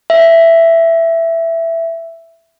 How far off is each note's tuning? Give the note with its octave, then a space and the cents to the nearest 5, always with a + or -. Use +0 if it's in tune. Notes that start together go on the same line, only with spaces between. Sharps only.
E5 +10